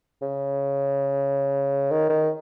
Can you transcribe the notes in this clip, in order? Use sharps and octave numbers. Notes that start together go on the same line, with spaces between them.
C#3
D#3
D#3